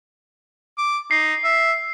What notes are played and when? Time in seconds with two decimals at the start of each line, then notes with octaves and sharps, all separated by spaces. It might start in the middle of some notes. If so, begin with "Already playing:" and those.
0.78 D6
1.11 D#4 C7
1.44 E5